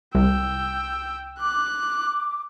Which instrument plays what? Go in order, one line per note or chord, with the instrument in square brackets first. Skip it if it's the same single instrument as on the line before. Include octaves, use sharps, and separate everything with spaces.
[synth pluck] C2 [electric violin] G5 E6
[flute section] D6 [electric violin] F#6